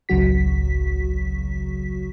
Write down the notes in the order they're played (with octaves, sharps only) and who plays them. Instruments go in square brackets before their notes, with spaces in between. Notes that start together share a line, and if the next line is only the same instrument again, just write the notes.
[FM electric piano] G#1 C#2 C#3 F#3 F#4 B6